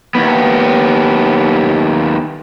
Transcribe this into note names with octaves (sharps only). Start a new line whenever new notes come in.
D#2 B3